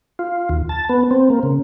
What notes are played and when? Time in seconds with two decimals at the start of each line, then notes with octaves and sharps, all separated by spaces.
0.19 F4
0.49 D#2
0.69 A5
0.89 B3
1.11 C4
1.30 A#3
1.43 C#3